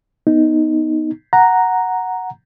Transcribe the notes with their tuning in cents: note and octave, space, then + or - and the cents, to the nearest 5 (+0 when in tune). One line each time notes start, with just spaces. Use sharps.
B3 +0 D#4 +0
F#5 +0 A#5 +0